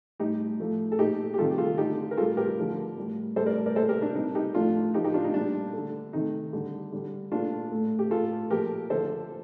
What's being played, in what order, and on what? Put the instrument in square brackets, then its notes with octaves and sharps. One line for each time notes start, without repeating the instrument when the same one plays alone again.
[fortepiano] A2 G3 D#4 G4
A2 F3 A3
A4
A#2 A3 D#4 G4
G4
C3 D#3 G3 F4 A4
G4
F4 A4
D3 A3 D#4 G4
A#4
A2 G3 F4 A4
G4 A#4
D3 F3 A3
A2 G3
A2 G3 A4 C5
A#4 D5
A#4 D5
A#2 A3 A4 C5
G4 A#4
D4
C3 G3 D#4
D#4 G4
A2 F3 A3 D4 F4
A2 F3 A3 D#4 G4
D#4 G4
D4 F4
D#4
A#2 G3 D4
D3 A3
C3 D#3 A3 D#4
D3 G3
D3 G3
A#2 A3 D4 F4
A2 A3
G4
A2 A3 F4 A4
A#2 F3 A3 G4 A#4
D3 F3 A3 A4 C5